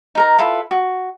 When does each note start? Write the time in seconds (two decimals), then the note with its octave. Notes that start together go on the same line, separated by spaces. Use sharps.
0.15 D#4 A#4 A#5
0.38 E4 F4 A4 B4
0.71 F#4